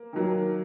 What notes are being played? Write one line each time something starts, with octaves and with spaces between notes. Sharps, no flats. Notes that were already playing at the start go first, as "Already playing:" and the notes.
Already playing: A#3
D#3 F#3 A#3